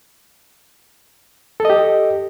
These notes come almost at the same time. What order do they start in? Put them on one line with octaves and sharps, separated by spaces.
A4 D#5 G4